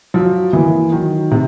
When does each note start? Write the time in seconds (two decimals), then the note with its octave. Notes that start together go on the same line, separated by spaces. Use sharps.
0.14 F3 F#3
0.53 E3 A#3
0.92 D#3 F#3
1.31 A2 C3